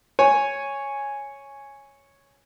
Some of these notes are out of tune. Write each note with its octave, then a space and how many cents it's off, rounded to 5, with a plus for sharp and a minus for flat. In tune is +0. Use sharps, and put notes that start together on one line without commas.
C#5 +0 G#5 +0